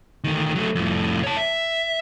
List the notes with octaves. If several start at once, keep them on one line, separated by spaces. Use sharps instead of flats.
D2 D#3
F#3 A3
F2 A2
C#5 A5
E5